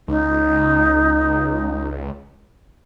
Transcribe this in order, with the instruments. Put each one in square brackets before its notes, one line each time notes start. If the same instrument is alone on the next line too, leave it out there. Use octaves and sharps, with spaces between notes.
[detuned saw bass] C#2 [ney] D#4